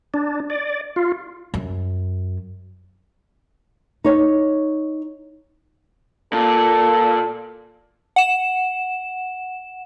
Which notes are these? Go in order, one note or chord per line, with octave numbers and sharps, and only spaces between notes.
D4
D5
F4
F#2
D#4 C#5
A#2 A4
F#5 E7